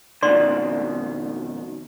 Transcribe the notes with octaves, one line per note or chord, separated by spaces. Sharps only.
F2 B2 D#3 D5 C6